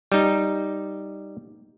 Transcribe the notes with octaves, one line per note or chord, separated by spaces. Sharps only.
G3 D#4